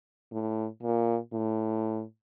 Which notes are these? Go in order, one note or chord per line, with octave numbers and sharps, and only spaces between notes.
A2
A#2
A2